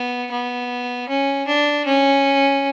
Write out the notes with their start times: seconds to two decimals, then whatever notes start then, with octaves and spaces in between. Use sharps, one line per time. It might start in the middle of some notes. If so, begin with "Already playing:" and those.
Already playing: B3
0.31 B3
1.08 C#4
1.47 D4
1.85 C#4